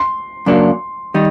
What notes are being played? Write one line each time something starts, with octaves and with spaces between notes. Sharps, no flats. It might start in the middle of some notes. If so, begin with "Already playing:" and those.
Already playing: C6
F#2 C#3 F#3 A#3 D4
D#3 G3 D#4